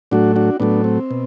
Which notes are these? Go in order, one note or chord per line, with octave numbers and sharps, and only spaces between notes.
A2 F#3 A3 D4 F#4
D4 F#4
A2 F#3 A3 B3 D4
C4
B2